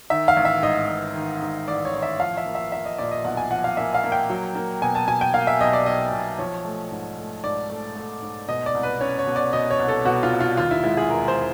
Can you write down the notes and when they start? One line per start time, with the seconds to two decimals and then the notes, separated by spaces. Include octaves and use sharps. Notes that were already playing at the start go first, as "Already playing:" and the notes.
0.10 D#3 E5
0.28 F5
0.37 A1
0.45 E5
0.63 G#2 D#5
0.89 A1
1.15 D#3
1.42 G#2
1.68 A1 D5
1.85 C#5
1.94 A1
2.03 E5
2.20 F3 F5
2.37 E5
2.46 A#3
2.55 E5
2.72 A#3 E5
2.85 D#5
2.98 A#2 D5
3.11 D#5
3.24 B1 F#5
3.37 G#5
3.51 F3 F#5
3.64 F5
3.77 A#3 E5
3.94 F5
4.04 A#3
4.12 G5
4.30 F#3
4.55 A#3
4.82 B2 G#5
4.95 A5
5.08 B2 G#5
5.21 G5
5.34 A#3 F5
5.47 E5
5.60 B1 D#5
5.73 D5
5.86 B1 D#5
6.13 B1
6.39 F3 C#5
6.65 A3
6.91 G#2
7.17 A3
7.44 G#2 D5
7.69 A3
7.96 A3
8.22 G#2
8.48 B2 D#5
8.66 D5
8.75 C2
8.83 B4
9.00 C#4 C#5
9.19 C#5
9.27 B2
9.36 D5
9.53 B2 D#5
9.71 C#5
9.79 C2
9.88 A4
10.05 B2 F#4
10.23 F4
10.32 C2
10.41 F4
10.57 D#2 F4
10.71 E4
10.84 G#3 E4
10.97 G#4
11.10 E1 A#4
11.28 C5